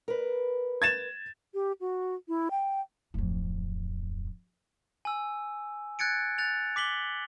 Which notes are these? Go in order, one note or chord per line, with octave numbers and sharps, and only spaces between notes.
A#4 B4
G#6 A6 E7
G4
F#4
E4
G5
D1 F2
G#5 E6
F#6 G#6 A6 C#7 D7
F#6 A6 F7
D6 B6 F#7 G7